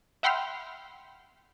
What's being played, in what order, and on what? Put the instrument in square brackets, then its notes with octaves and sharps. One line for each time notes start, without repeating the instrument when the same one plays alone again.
[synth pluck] E5 F#5 G5 B5 C6 F6